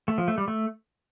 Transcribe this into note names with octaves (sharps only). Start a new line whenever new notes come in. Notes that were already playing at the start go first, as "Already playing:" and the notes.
A3
F3
A3
G3
A3